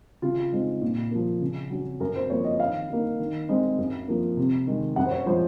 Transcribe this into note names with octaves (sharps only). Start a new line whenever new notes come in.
C#3 F4
G#3 C4 D#4
A#2
F3 A#3
C#3
F#3 C#4
F#2 A#4
C5
F3 A#3 C#5
D#5
D#3 F5
A#3 D#4
D#3
G#3 C4 D#4
F#2
F3 A#3
C3
D#3 G#3
F#2 F#5
C5
C#5
F3 G#3 C5